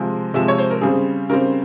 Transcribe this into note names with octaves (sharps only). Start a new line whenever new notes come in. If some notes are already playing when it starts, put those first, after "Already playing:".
Already playing: C3 F3 G#3
C3 F3 G#3 E5
C#5
C5
A#4
C#3 G3 C4 G#4
C#3 G3 C4 A#4